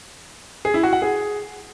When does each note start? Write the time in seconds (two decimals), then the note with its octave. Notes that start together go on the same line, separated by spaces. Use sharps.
0.65 G#4
0.74 E4
0.83 F#4
0.93 F#5
1.02 G#4